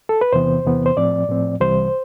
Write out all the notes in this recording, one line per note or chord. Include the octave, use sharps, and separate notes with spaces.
A4
B4
E2 C3 E3 B3 C5
E2 C3 E3 B3
C5
A2 F3 C4 D5
A2 F3 C4
C2 C3 E3 G3 C5